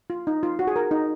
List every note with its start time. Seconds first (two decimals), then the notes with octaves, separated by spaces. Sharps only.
0.10 F4
0.27 D#4
0.43 F4
0.59 F#4
0.67 G#4
0.76 A#4
0.91 D#4